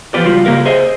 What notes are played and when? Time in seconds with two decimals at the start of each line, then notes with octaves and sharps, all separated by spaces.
0.14 E3 F3 B3 F4 G4 D5
0.26 C#2 G3 F4 F#4
0.45 C#3 A#3 G4 A#4 F5
0.66 G#4 C5 D#5 E5